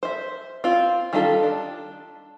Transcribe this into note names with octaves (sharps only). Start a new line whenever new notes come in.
C5 E5
C4 F4
D#3 G3 D4 F4 A4
D4